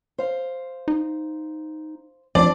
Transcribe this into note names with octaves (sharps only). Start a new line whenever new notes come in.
C5 F5
D#4
F3 C4 D4 F4 D5